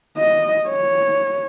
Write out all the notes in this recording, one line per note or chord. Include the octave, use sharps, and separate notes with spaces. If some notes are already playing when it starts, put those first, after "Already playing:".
D#5
C#5